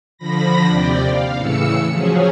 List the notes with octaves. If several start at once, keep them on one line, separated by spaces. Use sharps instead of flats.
D3 F3 B5 A#6
D#2 C3 D5 G5
F5
A2 C#3 E3 E6 C#7
F3 F#3 C#4 G#4